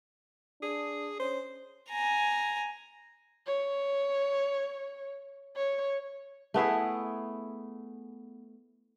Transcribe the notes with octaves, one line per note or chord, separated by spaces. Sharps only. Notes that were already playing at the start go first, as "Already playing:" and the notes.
D4 G#4
C#4 C5
G#5 A#5
C#5
C#5
A3 B3 E4 G#4